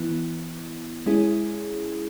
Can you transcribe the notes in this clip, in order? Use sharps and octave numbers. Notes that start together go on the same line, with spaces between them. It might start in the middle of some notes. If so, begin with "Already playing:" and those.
Already playing: E3 B3 E4
G#3 C#4 E4 G#4